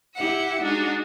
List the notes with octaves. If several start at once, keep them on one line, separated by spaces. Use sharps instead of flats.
E4 G4 E5 F#5
G#3 D4 D#4 F#4